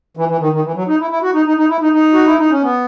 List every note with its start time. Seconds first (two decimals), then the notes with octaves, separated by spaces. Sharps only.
0.17 E3
0.29 E3
0.40 D#3
0.52 D#3
0.64 E3
0.75 F#3
0.88 D#4
0.99 E4
1.11 E4
1.23 F#4
1.34 D#4
1.46 D#4
1.57 D#4
1.69 E4
1.81 D#4
1.93 D#4
2.13 F#4
2.26 E4
2.38 D#4
2.50 C#4
2.62 B3